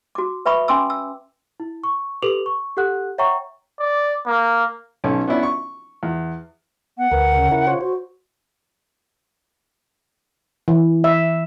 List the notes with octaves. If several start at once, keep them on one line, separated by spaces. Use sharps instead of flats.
F#4 D6
B4 E5 B5 C#6 D#6
C#4 G#5 C6 D6 E6
E6
E4
C#6
G4 A4 B4 D6 F7 F#7
C#6
G4 A4 F#5 F#6
C#5 E5 F#5 G5 A#5 C#6
D5
A#3
B1 C#4 A4
B3 C#4 D4 E4
C#6
E2
B3 F#5
D2 A#4 B4
C#3
E4 A#4
F4 C5 C#5
F#4 C5
E3
E5